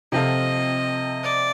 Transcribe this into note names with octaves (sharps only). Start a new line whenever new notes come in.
C3 F3 C4 F4 A4 D#5
D5